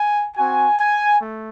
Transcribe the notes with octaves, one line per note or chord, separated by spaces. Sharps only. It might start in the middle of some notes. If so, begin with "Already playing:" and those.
Already playing: G#5
C4 F#4 G#5
G#5
A3